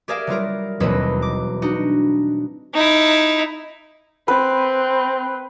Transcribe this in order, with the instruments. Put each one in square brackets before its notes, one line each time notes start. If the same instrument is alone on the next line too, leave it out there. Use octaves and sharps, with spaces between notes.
[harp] G4 G#4 A#4 D5 E5 F5
F#3 G3 F4 A#4
E1 D#2 F#3 C4 B4 D#5
D6
D4 D#4 F#4
[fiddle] D#4 E4
[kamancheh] C4 [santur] B4